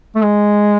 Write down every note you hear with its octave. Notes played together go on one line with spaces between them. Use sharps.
A3
G#3